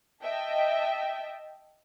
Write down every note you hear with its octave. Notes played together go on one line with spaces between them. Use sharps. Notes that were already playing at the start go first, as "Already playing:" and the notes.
D#5 E5 G5 A5